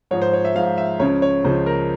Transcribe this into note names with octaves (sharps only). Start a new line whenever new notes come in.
G#2 F3 C#5
C5
C#5
E5
G#2 F3 F5
E5
C#2 C#3 F3 C#5
C#5
C#2 C#3 F3 C5
A#4